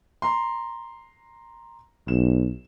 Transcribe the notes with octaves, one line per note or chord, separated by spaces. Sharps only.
A#5 C6
B1 E7